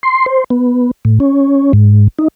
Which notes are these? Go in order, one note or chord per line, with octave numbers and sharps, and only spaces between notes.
C6
C5
B3
A2
C#4
G#2
D#4